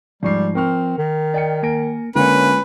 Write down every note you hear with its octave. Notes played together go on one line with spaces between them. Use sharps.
G#2 F3 G3 C#6 C7
C4 A#4 C#6 F6
D#3
D5 D#5 G5 C#7
A#3 A#4 G#5 D7
D3 G#3 A#3 C#4 F4 B4 C#5